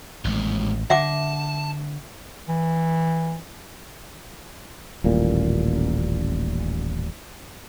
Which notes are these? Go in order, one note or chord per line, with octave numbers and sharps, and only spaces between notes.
A1 D#2 G#2
D3 E5 F#5 A5 D6
E3
D#1 A1 A#2